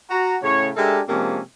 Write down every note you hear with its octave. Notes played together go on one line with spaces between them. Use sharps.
F#4 A#5
A2 C#3 C#5
G#3 D4 G4 A4 A#4 E5
C3 F3 G#3 A#3 C#4 D4